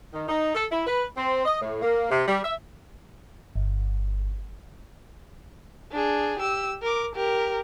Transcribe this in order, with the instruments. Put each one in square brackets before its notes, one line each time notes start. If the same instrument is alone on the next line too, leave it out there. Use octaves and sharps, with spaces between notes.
[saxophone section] D#3
D#4
A4
E4
B4
C4
D#5
A2
A#3
C3
G3
E5
[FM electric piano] G1
[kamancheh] D4 G#4
G4 E6
A#4 D6
G4 A#4